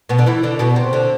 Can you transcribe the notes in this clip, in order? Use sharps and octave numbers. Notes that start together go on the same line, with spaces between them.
B2 B3
D3 D4
E3 E4
D3 D4
B2 B3
C3 C4
D3 D4